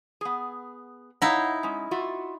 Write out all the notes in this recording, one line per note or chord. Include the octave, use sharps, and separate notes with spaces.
B3 G#4
D#4 E4 C#5 F5 F#5
G#3 C#4
F4 F#4 E5